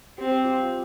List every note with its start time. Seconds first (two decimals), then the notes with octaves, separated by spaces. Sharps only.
0.18 C4 G4
0.32 G4
0.45 F4
0.58 F4